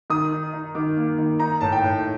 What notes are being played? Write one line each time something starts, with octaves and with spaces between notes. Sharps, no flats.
D#3 D#6
D#4
D#4
D#3 D6
A#3
D#3
D#4 A#5
A2 A5
G5
A2